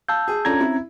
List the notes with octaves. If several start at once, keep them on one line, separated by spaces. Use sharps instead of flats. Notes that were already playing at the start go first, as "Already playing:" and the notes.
F5 A5 E6 G6
G#4
C#4 D4 F4 A4 A#5 G#6
C4 E4